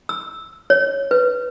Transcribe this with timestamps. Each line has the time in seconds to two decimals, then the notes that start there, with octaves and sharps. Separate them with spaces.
0.09 E6
0.70 C#5
1.11 B4